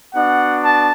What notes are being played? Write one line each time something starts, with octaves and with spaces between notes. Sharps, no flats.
B3 D4 F#4 F#5
A5